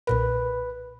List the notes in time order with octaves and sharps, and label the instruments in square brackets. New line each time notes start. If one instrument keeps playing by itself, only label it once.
[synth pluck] B1 A#2 A#4 [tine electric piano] B4